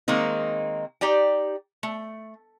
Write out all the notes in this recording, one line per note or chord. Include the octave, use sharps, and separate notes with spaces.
D#3 G#3 A#3 C4 D#4
D#4 G4 D5 G5
A3